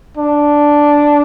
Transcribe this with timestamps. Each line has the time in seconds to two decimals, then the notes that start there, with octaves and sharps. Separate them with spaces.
0.17 D4